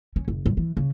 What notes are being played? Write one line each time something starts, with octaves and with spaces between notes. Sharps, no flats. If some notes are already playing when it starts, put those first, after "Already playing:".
C#4
F#1
G2
E3
C#3